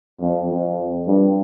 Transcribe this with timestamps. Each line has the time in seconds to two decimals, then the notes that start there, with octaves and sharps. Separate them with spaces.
0.21 F2
0.50 F2
1.07 G2